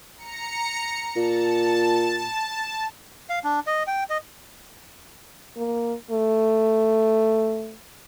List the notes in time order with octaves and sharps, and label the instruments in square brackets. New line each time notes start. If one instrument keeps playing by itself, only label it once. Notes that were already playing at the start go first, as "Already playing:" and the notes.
[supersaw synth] A#5 C#7
[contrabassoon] A#2 [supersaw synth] A5
[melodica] F5
D4
D#5
G5
D#5
[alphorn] A#3
A3